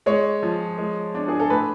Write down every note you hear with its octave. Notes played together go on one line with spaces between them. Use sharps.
G#3 C#5
F3
G#3
D4
G#4
A4
A2 B4